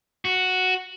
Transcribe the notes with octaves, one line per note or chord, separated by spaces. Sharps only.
F#4